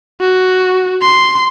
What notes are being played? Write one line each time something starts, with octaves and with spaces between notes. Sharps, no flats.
F#4
C6